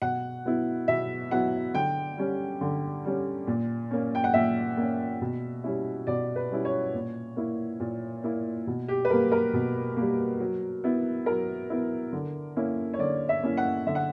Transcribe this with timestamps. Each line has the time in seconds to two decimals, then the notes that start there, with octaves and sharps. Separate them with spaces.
0.01 B2 F#5
0.45 F#3 B3 E4
0.88 B2 E5
1.31 F#3 B3 E4 F#5
1.74 D3 G5
2.18 G3 C#4
2.61 D3
3.05 G3 C#4
3.47 A#2
3.91 A#3 C#4
4.15 G5
4.24 F#5
4.34 A#2 E5
4.77 A#3 C#4
5.21 B2
5.64 G3 C#4 E4
6.07 B2 D5
6.36 B4
6.50 G3 C#4 E4
6.65 C#5
6.94 A#2
7.36 A#3 E4
7.80 A#2
8.24 A#3 E4
8.67 B2
8.88 G4
9.05 B4
9.10 G3 A#3 A#4
9.32 A#4
9.53 B2
9.97 G3 A#3
10.40 F#3
10.84 B3 E4
11.26 F#3 A#4
11.70 B3 E4
12.13 D3
12.56 A#3 C#4 E4
12.94 C#5
12.99 D3 D5
13.29 E5
13.43 A#3 C#4 E4
13.57 F#5
13.86 D3 E5
13.95 F#5